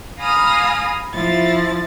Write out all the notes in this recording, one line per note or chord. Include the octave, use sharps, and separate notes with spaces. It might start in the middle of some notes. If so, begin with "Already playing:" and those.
F5 G#5 A#5 B5 D#6 F6
F3 E4 A6